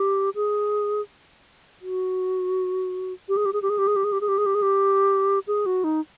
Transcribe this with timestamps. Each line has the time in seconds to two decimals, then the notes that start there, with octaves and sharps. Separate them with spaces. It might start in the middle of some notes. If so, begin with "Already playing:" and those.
Already playing: G4
0.35 G#4
1.81 F#4
3.29 G4
3.37 G#4
3.45 G4
3.53 G#4
3.62 G4
3.70 G#4
3.78 G4
3.87 G#4
3.96 G4
4.04 G#4
4.12 G4
4.21 G#4
4.28 G4
4.38 G#4
4.46 G4
4.55 G#4
4.62 G4
5.47 G#4
5.66 F#4
5.84 D#4